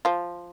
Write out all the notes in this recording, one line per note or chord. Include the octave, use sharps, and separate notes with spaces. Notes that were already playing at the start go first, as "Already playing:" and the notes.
F3 F4